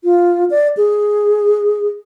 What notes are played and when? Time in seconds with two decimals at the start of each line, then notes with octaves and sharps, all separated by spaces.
0.04 F4
0.50 D5
0.77 G#4